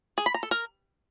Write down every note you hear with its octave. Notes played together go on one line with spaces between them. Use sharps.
G#4
B5
A#5
A4
A#4